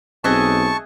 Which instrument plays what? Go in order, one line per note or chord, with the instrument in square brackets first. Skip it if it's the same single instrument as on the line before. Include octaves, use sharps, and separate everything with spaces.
[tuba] B1 [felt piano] C4 F#6 [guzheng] G#4 D#5 E5 [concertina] A5 C#6